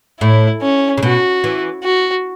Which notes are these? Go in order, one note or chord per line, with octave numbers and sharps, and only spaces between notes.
A2 E4
C#4
C#3
B2 F#4
E3
F#4